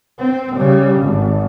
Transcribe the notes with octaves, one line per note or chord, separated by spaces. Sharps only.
C4
C#3 G3
G#1